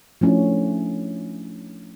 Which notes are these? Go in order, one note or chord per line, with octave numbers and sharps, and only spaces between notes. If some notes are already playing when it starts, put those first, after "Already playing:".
F3 A3 C#4 D4 E4